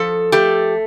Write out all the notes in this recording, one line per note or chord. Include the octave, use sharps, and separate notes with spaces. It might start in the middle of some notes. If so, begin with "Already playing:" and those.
Already playing: F3 A4
A3 G4